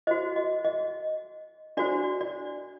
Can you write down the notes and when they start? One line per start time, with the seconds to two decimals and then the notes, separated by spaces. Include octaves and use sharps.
0.07 F#4 C5 D#5
0.36 D#5
0.65 D#5
1.77 D4 F#4 C5 D5
2.21 D5